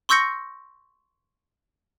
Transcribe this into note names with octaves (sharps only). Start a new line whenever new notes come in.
C6 C#6 E6 G6 A#6 C#7